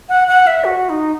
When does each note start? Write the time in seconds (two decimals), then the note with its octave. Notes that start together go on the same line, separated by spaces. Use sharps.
0.09 F#5
0.28 F#5
0.47 E5
0.64 F#4
0.89 D#4